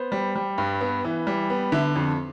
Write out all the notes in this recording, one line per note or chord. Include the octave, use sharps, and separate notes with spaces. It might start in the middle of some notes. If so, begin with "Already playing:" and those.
Already playing: B3 C5
G3
G3
G2
B3
E3
G3
B3
D3 E5
F2